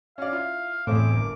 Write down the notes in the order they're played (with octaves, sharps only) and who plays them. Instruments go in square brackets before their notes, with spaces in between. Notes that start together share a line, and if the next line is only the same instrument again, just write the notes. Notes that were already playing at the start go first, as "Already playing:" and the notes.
[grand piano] C#4 F#4 D5 [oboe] F5
[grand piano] E4 F4
[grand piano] E2 C4 [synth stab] A2 [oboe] D6
[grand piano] G1 A#4